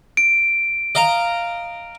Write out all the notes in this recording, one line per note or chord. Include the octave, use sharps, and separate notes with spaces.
D7
D#5 F5 A#5